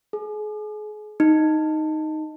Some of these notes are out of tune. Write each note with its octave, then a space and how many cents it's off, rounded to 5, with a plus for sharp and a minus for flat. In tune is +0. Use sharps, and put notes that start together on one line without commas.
G#4 +35
D#4 +0